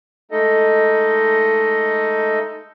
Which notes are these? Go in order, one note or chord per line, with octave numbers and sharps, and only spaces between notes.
G#3 A3 D#4 A4 D#5